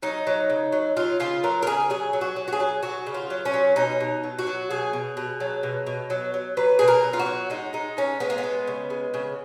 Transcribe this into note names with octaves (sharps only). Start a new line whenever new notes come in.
F#3 D#4
F#3
C#3
F#3
F#3 F4
C#3 F4
F#3 A#4
A#4
C#3 G#4
F#3 G#4
F#3
F#4
F#3
F#4
G#4
F#3
F#3 F#4
C#3
F4
F#3
C#4
F#3
B2 D#4
B2
F#3
F#4
F#3
B2 G#4
B2
B2
F#3
B2
B2
F#3
F#3
F#3 B4
B2 G#4
A#4
F#3
F4
F#4
F#3
G#3 D#4
G#3 D#4
G#3 C#4
G#3 B3
A#3
B3
G#3
C#3
G#3
C#3